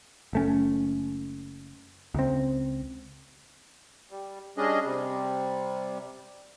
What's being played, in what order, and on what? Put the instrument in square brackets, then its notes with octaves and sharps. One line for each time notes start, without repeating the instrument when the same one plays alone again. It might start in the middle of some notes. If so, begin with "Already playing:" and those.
[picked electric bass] F#1 A3 C#4
C#2 C4
[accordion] G3
G3 C#4 D4 G#4 D#5
C3 G3